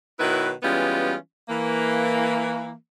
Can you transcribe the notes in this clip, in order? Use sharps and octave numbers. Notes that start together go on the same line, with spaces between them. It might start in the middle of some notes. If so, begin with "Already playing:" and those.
B2 D#3 F#3 E4 B4
E3 G3 G#3 B3 C#4 F4
E3 A#3